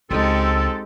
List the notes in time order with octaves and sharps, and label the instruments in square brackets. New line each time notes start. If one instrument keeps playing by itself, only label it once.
[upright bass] C#2 [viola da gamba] G#3 D#4 G4 [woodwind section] C4 A4